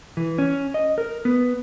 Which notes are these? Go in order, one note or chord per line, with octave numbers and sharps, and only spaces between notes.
E3
C#4
D#5
A#4
B3